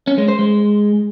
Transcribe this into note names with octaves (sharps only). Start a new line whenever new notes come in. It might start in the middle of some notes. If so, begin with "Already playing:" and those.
C#4
G#3
C5
G#3